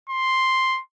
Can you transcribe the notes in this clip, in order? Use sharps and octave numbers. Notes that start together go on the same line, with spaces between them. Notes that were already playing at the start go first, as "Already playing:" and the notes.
C6